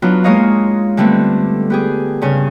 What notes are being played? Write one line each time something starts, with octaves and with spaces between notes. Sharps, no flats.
F#3 B3 D4 D#4 F4
G#3 A#3 D#4 C#5 D#5 F5
D3 G3 A3 B3 C4
B3 G4 G#4
G2 C#3 G#5